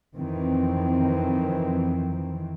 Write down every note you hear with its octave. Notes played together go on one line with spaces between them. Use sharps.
F2 D#3 E3 C4